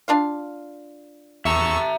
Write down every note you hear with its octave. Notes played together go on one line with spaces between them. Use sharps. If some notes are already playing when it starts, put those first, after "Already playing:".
D4 F4 F5
E2 A3 E5 A#5 C#6 E6